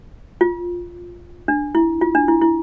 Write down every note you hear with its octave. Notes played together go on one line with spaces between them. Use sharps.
F4
D4
E4
F4
D4
E4
E4